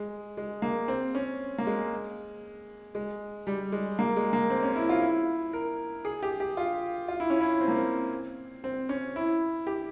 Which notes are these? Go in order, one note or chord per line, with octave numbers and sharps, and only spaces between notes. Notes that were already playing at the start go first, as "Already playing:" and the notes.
Already playing: G#3
G#3
A#3
C4
C#4
A#3
G#3
G#3
G3
G#3
A#3
G#3
A#3
C4
C#4
E4
F4
E4
A#4
G#4
G4
G4
F4
F4
E4
C#4
E4
C4
A#3
C4
C4
C#4
E4
G4